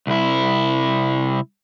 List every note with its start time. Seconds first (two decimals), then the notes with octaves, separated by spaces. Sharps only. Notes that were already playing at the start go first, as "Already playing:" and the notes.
0.07 C2 E4